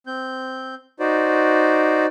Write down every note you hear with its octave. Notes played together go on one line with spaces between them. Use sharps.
C4 G6
D#4 F#4 C5 D5